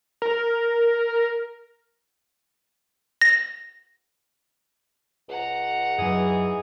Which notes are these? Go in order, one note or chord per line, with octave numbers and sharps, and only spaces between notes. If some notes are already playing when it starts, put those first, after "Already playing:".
A#4
A#6
C#2 F#5 A#5
F#2 E3 F#3 D#4 G#4